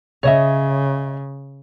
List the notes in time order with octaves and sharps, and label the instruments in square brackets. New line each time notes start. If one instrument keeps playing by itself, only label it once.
[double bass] C#3 [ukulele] C#5 D#5 E5